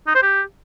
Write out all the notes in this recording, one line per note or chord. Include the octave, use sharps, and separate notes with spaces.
D#4
C5
G4